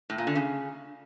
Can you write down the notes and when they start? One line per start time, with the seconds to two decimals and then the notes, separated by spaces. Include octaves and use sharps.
0.10 A2
0.18 A#2
0.27 D3
0.35 C#3